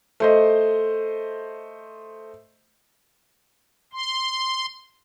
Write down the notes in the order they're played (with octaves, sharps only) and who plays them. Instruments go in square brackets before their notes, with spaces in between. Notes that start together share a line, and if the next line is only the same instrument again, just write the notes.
[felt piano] A3 C5 D#5
[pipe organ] C6